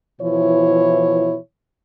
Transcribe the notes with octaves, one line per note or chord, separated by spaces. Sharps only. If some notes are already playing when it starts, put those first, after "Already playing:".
B2 E3 F3 E4 C#5